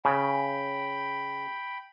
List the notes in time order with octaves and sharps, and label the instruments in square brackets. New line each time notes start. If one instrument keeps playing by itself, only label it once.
[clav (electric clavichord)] C#3 [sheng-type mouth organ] G5 B5